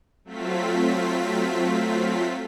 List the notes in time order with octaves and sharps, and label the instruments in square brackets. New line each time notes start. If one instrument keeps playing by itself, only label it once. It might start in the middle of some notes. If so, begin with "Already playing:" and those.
[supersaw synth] F#3 A3 C4 F4 B6